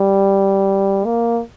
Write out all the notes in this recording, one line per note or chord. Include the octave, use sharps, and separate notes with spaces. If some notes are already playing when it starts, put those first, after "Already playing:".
Already playing: G3
A#3